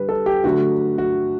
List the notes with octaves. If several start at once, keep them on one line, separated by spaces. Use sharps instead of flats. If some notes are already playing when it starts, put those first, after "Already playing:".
Already playing: D3 G3 B4
A4
G4
D3 F#3 A3 F#4
F#4